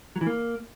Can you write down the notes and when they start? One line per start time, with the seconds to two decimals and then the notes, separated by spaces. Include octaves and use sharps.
0.16 F#3
0.21 E3
0.27 A#3